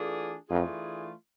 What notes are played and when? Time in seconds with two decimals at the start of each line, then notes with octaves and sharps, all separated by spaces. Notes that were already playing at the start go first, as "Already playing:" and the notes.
Already playing: E3 A3 D4 F4 G#4
0.49 F2 E3 A3 D4 F4 G#4